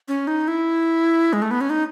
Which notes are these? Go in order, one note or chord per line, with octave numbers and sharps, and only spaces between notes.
C#4
D#4
E4
G#3
A3
B3
C#4
D#4